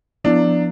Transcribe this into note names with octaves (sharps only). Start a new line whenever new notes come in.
F3 B3 D4 E4